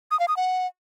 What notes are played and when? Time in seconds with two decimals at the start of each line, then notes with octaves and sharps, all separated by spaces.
0.11 D#6
0.20 F5
0.28 D#6
0.37 F#5